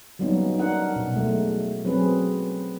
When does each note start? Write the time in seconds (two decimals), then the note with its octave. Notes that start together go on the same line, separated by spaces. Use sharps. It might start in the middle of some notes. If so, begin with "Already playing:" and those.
0.19 F#3 G3 A#3 B3 C#4 D#4
0.59 D4 D#4 A#4 F#5
0.96 B2
1.16 F#3 G#3 A3
1.85 F#3 C4 C#4 G#4 B4